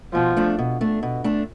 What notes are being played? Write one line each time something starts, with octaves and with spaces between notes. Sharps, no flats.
B2 F3
A3 D4
B2
A3 D4
B2
A3 D4